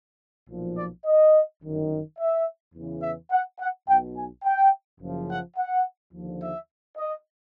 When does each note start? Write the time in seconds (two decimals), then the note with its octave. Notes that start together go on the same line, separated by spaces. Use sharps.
0.49 B1 A#2 F3
0.77 D5
1.06 D#5
1.62 G1 F#2 D#3
2.19 E5
2.75 E2 C#3 E3
3.03 E5
3.31 F#5
3.60 F#5
3.88 B1 B2 G5
4.16 G#5
4.44 G5
5.00 F#1 F#2 C#3 F3
5.29 F#5
5.57 F#5
6.13 D#2 D3 F3
6.41 E5
6.97 D#5